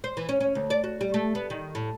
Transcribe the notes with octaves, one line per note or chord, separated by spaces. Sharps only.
C5
E3
C#4
C#4
D2
D5
F#4
G3
A3
B3
D#3
A2